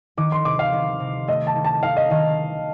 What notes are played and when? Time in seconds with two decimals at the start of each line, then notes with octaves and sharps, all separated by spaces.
0.17 D#3 D6
0.32 C6
0.45 C3 D6
0.59 F5
0.73 D#3
1.00 C3
1.28 A3 D#5
1.47 A5
1.55 D#3
1.65 A5
1.83 D#4 F5
1.97 D#5
2.10 D#3 D#5